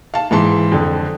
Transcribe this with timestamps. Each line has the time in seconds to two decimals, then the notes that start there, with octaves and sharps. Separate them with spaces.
0.14 F5 A5
0.31 G#2 E3 A5 C6
0.72 F2 D3